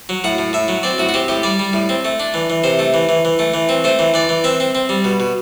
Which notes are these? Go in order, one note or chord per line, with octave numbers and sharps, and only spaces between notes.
F#3
A2 F#5
A2
A2 E5
F#3
C4 D5
A2 F#4
F#4
C4 G4
A2 G4
G3 D5
G3
A2
C4
A3
D4
E3
E3
C3 C5
A3
E3
E3
E3
A3
E3
C4
A3 C5
E3
E3 D5
E3
C4 E5
C4
C4
G3
B2
B2